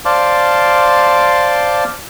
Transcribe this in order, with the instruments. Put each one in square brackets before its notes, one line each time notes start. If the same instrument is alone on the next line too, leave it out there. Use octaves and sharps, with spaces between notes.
[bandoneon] C5 D5 F5 A5 C6 D6